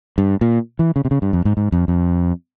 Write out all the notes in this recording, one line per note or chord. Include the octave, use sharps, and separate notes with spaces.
G2
A#2
E3
C#3
C3
C#3
G2
F2
G#2
G#2
F2
F2